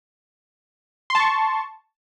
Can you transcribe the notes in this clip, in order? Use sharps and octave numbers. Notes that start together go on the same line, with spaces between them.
A5 C6 C#6